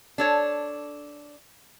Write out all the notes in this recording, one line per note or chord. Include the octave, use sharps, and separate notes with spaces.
D4 A4 C#5